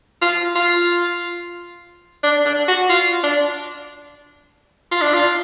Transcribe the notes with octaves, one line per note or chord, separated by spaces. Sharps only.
F4
F4
D4
D4
F#4
F4
D4
F4
D4
F4